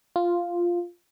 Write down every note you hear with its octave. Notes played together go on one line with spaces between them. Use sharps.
F4